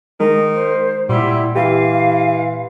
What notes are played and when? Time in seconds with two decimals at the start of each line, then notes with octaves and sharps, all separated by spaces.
0.20 D#3 G#3 D#5
0.54 C5
1.09 A#2 G3 E4 F#5 C6
1.56 E3 G4 F5